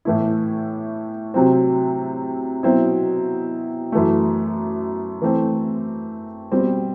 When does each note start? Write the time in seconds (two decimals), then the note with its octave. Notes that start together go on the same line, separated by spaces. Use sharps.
0.05 A2 E3 A3 E4
1.34 C3 F#3 C4
2.63 B2 F#3 C4 E4
3.92 F#2 E3 A3
5.22 E3 A3 C4
6.52 B2 G3 C4